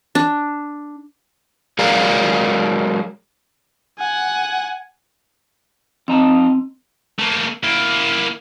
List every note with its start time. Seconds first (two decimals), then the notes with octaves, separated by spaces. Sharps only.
0.15 D4
1.79 F#3 G#3 G#4 A#4 D5 F5
3.99 F#5 G#5
6.08 F2 C4 D#4 A5
7.19 A3 A#3
7.64 A#3 E4